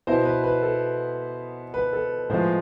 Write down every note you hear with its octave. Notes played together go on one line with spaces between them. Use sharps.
B2 B3 E4 C5
B4
B4
A4
B4
A4
A2 F3 G#3 B3 C5